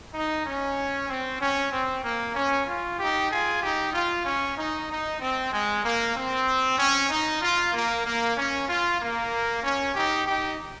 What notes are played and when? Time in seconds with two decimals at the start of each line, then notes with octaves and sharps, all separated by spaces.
0.14 D#4
0.45 C#4
1.09 C4
1.40 C#4
1.72 C4
2.03 A#3
2.35 C#4
2.67 F4
2.99 D#4 G4
3.30 F4 G#4
3.62 D#4 G4
3.93 F4
4.25 C#4
4.57 D#4
4.88 D#4
5.20 C4
5.52 G#3
5.84 A#3
6.16 C4
6.78 C#4
7.10 D#4
7.42 F4
7.73 A#3
8.05 A#3
8.37 C#4
8.69 F4
9.00 A#3
9.63 C#4
9.95 D#4 G4
10.27 D#4 G4